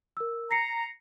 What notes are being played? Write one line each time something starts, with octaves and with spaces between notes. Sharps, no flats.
A#4 E6
A#5 A#6 C7 C#7